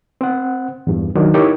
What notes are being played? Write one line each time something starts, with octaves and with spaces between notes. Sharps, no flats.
C4 C5 F#5
E2 G2
D#3 F#3 D4
D#4 E4 G4 A#4 C#5 C#6